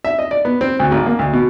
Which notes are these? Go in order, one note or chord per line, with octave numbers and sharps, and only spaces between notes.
E5
D#5
D5
B3
C4
D2
G#1
A#3
D2
B2